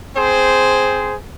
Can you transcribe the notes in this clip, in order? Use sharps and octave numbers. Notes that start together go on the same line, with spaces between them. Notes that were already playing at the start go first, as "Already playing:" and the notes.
C4 G#4 C5